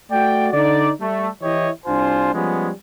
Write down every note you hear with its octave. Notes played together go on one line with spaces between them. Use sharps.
A3 F#4 D5 G5
D3 D#4 D5
G3 A3
E3 E4 G4 C#5 D#5
C2 D4 F4 C5 G#5
F3 G3 G#3 B3 C#4